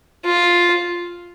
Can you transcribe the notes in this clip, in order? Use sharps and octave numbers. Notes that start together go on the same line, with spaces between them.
F4